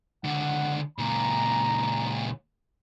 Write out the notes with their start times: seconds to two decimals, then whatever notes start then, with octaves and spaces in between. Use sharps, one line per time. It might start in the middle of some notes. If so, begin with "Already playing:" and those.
0.24 C#2 D3 F#5
0.98 C#2 A#2 A#5